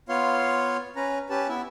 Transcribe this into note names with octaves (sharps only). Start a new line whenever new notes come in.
B3 F4 C#5 F5 C6
C#4 B4 A#5
C#4 G4 B4 A5
B3 E4 E5